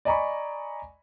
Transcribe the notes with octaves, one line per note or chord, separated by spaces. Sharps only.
D5 D#5 G#5 A#5 B5 C#6